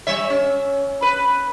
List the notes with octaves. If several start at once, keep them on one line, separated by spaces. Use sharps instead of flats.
G3 C#5 E5
C#4
B4